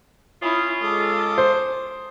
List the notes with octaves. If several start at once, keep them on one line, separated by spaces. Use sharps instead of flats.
C#4 E4 F4 D#6
G#3 A4 D6 D#6
C5